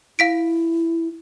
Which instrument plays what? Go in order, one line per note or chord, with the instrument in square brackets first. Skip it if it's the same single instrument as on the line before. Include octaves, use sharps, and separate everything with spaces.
[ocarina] E4 [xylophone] F5 B6 D7